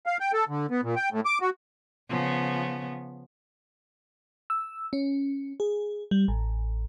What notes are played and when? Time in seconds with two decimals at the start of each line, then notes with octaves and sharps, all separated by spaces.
0.06 F5
0.20 G5
0.33 A4
0.49 D3
0.71 B3
0.83 A#2
0.96 G5
1.12 A2
1.25 D6
1.41 F#4
2.09 C#3 F3 B3
4.50 E6
4.93 C#4
5.60 G#4
6.11 G3
6.28 A1